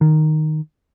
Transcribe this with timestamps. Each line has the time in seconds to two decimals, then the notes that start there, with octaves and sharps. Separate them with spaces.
0.01 D#3